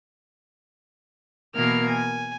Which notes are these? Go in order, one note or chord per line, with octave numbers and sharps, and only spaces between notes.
B2 E3 A#3 A#4 F6 G#6
G#5